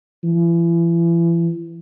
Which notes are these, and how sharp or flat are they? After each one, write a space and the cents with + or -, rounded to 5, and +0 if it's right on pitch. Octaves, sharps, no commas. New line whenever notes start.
E3 +35